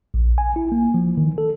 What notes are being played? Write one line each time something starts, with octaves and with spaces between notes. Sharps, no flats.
A#1
G#5
E4
A#3
F3
D#3
A4